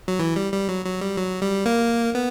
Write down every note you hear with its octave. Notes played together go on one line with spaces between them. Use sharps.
F#3
E3
G3
G3
F#3
F#3
G3
F#3
G3
A#3
B3